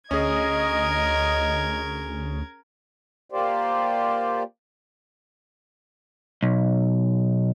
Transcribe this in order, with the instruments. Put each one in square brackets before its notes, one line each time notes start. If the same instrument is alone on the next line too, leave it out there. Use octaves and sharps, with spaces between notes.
[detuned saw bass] D2 [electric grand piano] C#4 G#4 [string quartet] A#4 G#6 [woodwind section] D#5
[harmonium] A#3 F4 G4 C5 D5
[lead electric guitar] B1